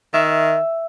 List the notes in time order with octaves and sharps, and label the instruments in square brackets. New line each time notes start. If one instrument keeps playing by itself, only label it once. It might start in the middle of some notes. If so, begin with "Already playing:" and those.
[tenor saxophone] D#3 [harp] E5